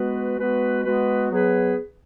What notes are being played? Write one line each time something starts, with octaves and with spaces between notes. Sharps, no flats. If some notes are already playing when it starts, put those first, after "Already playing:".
Already playing: G#3 B3 F#4 B4
G#3 B3 F#4 B4
G#3 B3 F#4 B4
F#3 B3 G#4 B4